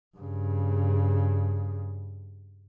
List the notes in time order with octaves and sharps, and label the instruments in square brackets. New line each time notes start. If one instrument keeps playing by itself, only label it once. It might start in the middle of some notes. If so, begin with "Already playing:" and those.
[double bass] G2 C#3